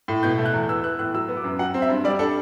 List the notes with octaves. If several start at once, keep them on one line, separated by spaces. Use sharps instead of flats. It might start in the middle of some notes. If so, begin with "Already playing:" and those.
A2
B2 G6
A3
F#6
E2
E3 E6
B3 F#6
A2 F#6
F#3 E6
B3
D6
F#2
F#3 F#5
C4
E5
G2
G3 D5
D4 A4